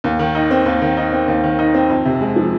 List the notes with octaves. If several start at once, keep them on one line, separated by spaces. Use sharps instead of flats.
D#2
D#3
D#4
C4
D#2
D#3
D#4
C4
D#2
D#3
D#4
C4
F2
C3
G#3
F3